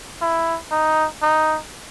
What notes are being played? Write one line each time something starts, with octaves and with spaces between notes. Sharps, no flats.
E4
D#4
D#4